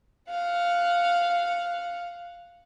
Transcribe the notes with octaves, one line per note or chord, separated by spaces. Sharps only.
F5 F#5